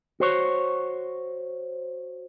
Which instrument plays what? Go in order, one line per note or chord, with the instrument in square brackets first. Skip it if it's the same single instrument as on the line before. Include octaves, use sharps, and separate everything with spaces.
[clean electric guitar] F#4 C5 C#5